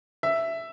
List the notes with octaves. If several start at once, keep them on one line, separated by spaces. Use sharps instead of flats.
E5